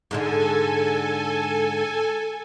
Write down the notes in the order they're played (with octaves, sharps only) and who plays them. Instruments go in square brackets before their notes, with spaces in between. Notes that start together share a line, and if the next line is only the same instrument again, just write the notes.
[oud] G#2 D3 G#3 [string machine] A4 G#5